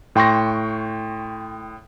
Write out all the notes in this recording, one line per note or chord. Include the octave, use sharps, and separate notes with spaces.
A2 G5 C6 C#6 A#6